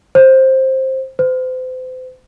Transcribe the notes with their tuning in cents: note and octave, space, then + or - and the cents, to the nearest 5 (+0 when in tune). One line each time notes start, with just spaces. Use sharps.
C5 +15
C5 -35